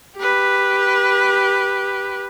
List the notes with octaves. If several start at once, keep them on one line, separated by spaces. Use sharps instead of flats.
G4 B4